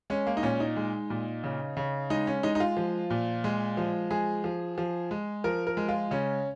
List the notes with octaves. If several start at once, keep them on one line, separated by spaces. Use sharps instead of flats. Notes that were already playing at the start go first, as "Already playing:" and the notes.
G#3 C#4
A#3
D#4
A#2 C#4
D#4
G#3
A#2
C#3
C#3
G#3 D#4
C#4
G#3 D#4
D#4
F4
F3
A#2
G#3
F3
G#3 G#4
F3
F3
G#3
F3 A#4
A#4
G#3
F4
C#3 C#4